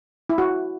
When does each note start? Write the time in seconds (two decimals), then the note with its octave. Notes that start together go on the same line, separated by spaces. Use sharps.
0.29 E4
0.38 F#4